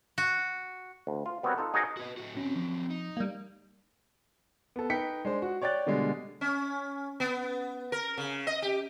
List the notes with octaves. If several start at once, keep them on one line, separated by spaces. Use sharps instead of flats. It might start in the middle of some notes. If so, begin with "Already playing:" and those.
F#4
D2
F4
G3 B3 C4 F#4 A#4 C#5
D#4 F4 A4
D#4 F#4 G#4 A#4 C#5 D#5
F#4 B4 D#5
A2 A3 F#4
F#3 C4 C#4
F3
D#4
G3 A#3
B3 A4
D#4 B4 G5 B6 C#7
G#3 D4 C5
F#4
C#5 D5 G5 F#6 A6
B2 D3 G3 G#3
C#4
B3
A#4
C#3
D#5
G4